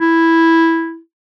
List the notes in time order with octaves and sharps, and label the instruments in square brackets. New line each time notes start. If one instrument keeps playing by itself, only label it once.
[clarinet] E4